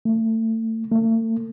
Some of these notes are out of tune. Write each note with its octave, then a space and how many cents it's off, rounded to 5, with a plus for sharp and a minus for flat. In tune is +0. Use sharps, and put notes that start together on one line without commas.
A3 +30
A3 +40